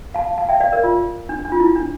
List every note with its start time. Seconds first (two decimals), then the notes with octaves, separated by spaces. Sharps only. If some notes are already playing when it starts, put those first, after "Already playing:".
0.14 F5 A5
0.38 F5 A5
0.49 E5 G5
0.60 D5 F5
0.73 A#4 D5
0.83 F4
1.29 D4
1.45 D4
1.52 F4
1.60 E4
1.75 D4